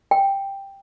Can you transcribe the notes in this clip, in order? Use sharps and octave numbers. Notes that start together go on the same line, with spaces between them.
G5